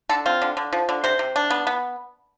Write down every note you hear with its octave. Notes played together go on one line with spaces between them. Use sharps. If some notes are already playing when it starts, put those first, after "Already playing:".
D3 A4
C4 F4
D3
D3
F3
D3
C3 C5
C3
D4
B3
B3